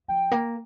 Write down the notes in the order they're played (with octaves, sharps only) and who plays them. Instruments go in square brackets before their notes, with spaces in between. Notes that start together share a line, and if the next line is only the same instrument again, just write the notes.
[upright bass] F3 [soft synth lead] G5
[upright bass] A#3